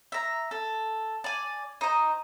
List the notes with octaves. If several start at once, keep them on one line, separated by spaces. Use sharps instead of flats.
E5 A#5
A4
D5 G#5
D#4 C5